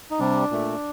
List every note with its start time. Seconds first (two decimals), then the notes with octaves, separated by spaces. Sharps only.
0.11 D#4
0.19 C3 G3 D4
0.51 A#2 A3